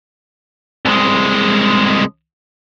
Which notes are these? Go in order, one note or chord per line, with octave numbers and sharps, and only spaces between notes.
C2 G#3